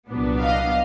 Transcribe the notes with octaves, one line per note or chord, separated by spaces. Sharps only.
C2 A#2 F#3 B3 D4
D#5 F5